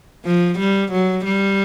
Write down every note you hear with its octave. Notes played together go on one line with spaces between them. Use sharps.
F3
G3
F#3
G3